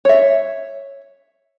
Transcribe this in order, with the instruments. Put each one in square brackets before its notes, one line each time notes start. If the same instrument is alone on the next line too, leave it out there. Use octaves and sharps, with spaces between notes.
[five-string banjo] C#5 E5